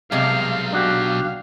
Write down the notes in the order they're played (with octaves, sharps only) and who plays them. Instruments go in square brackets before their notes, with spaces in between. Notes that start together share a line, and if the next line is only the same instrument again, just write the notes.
[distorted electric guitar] B1 [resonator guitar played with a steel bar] C3 G3 G#3 [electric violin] F5
[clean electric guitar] D4 F#4 G4 [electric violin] F5